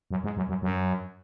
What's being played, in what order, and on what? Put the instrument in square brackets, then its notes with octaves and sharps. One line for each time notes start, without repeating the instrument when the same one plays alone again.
[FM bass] F#2
G#2
F#2
F#2
F#2